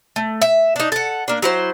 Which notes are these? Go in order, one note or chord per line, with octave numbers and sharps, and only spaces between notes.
A3
E5
D4 D#4
A4 F#5
A#3 D4
F#3 E4 C5